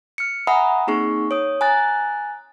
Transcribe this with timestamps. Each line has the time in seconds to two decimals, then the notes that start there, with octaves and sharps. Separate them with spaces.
0.18 F6 C#7
0.47 E5 F#5 G#5 A#5 B5 D#6
0.87 A#3 C4 D#4 G#4 C#6 C7
1.31 C#5 D#6
1.61 G#5 A#5 F#6 A6